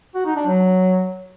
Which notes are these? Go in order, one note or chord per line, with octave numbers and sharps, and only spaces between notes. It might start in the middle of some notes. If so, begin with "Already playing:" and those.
F#4
D#4
D4
F#3